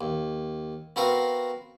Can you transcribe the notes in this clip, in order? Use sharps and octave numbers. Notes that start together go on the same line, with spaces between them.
D#2
B3 C4 F#4 A#4 B4 F5